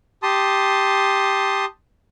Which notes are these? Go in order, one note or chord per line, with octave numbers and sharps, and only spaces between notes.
G4 A5 C6 D#6